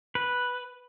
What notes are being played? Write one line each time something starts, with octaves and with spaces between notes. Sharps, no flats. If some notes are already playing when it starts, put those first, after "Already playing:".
B4